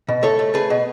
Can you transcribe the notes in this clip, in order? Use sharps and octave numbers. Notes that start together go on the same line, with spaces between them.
B2
A3 A4 C#5
A3
A3 G#4 B4
B2